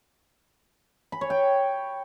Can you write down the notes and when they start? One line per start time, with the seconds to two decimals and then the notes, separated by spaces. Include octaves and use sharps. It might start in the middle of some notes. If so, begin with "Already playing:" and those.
1.12 B5
1.21 C#5
1.30 G5